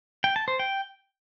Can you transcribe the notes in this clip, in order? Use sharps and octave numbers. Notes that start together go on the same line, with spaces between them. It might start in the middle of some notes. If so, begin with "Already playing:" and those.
G5
A5
C5
G5